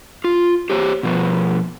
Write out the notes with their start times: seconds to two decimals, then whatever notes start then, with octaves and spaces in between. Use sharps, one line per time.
0.24 F4
0.70 G4 C5 C#5
1.03 B2 F3 B3